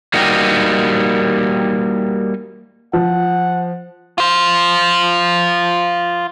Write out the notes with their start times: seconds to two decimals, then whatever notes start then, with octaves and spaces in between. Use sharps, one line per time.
0.14 G3 A#3 D#4 F#4 G4
2.93 F3 F#5
4.18 F4 C5